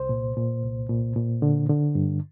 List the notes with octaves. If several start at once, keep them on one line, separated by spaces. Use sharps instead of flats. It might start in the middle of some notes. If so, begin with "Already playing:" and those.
Already playing: C2 C5
A#2
A#2
C2
A#2
A#2
D3
D3
G2